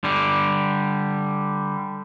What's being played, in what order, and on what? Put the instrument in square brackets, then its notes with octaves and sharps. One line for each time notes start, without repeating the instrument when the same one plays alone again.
[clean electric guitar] D3 G3